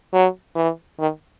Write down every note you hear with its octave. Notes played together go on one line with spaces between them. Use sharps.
F#3
E3
D#3